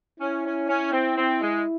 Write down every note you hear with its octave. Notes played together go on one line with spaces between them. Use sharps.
C#4 E4
C#4
C#4
C4
C4
G#3